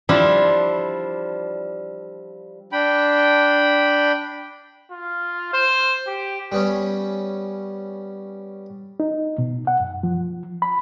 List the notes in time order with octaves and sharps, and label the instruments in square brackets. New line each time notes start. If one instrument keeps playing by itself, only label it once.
[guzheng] F3 G3 D4 E4 F4
[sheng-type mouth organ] D4 G5 B5
[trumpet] F4
C5
G4
[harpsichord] G3 B3 C#4
[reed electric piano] D#4
B2
F#5
F#2
F3
B5